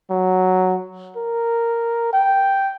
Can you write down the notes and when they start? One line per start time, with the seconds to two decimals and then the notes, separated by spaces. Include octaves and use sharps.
0.10 F#3
1.16 A#4
2.13 G5